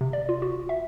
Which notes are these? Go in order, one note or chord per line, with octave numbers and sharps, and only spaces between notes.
C3
D5
F4
F#4
E5